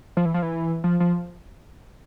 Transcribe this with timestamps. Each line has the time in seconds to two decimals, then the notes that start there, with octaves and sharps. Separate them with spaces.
0.17 F3
0.25 E3
0.34 F3
0.42 E3
0.84 F3
1.00 F3